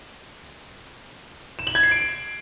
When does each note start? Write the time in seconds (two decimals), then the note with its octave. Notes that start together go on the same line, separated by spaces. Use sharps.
1.59 E7
1.67 F#7
1.75 G#6
1.83 C7
1.91 D7